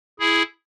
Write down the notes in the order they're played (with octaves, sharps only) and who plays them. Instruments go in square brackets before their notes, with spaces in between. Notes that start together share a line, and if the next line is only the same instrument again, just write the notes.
[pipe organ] E4 G#4